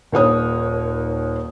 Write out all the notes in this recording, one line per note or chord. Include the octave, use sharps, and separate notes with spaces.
D#1 D#2 C#5 D#6